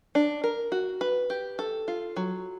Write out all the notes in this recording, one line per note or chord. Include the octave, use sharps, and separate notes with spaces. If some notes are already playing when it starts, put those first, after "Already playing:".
D4
A#4
F#4
B4
G4
A4
F4
F#3